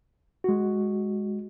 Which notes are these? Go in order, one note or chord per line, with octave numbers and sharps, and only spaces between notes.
G#3 F#4